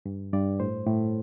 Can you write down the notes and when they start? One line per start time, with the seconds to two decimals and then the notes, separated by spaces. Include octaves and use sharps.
0.06 G2
0.33 G2 D5
0.60 A2 C5
0.87 A2